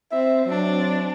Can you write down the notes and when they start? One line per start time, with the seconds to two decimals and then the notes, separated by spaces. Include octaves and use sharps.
0.12 C4 E5
0.45 F#3 C4 D4